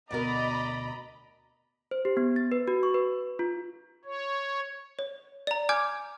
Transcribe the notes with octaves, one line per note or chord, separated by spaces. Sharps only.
D2 B2 A#4 D5 D#5 A#5 B5
C5
G4
B3
A6
B4
F#4
C#6
B4
F4
C#5
C#5
D5 A#5
G#5 D6 F6 G6 G#6